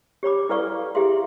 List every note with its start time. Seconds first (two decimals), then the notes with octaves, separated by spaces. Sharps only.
0.23 G4 C#5 B5 D6
0.49 E4 A4 B4 D5 F5 C#6
0.95 E4 G4 G#4 E5 F5 C6